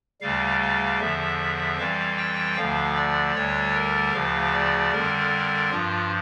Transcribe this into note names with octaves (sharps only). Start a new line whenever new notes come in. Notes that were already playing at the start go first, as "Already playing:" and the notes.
D2 C#3 G3 F5
F5
E2 D3 F3 E5
F2 E3 G3 F5
G5
D2 D3 F3 F5
D5
D2 D3 G3 C#5
A#4
D2 C#3 F3 F5
D5
F2 D3 G3 A#4
G2 F3 F4